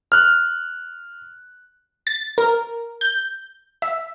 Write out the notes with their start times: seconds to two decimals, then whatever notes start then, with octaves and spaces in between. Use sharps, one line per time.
0.12 F6 F#6
2.07 A6
2.38 A#4
3.01 G6
3.82 E5